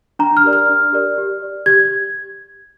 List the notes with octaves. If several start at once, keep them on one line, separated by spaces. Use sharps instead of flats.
D4 A#5
F6
G4 A#4 D5
F6
D4
G4 A#4 D5
G4
D5
G4 G#6